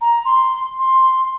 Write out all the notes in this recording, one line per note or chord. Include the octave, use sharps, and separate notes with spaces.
A#5
C6
C6